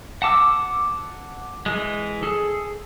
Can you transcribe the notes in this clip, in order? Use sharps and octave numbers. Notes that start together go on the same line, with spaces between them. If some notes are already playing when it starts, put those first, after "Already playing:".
F#5 A5 D6 E6
E3 G#3
G#4 A4